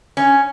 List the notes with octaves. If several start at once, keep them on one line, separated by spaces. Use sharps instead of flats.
C#4